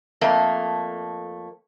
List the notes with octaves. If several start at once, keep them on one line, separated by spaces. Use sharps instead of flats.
F2 A3 A#3